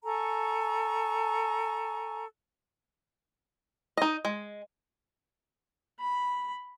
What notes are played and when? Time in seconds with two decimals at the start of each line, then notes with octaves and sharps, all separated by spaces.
0.04 A4 G#5 A#5 C#6
3.97 D#4 D#5
4.25 G#3
5.99 B5